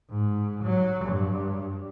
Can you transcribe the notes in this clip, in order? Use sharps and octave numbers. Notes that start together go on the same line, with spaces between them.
G#2
F#3
G2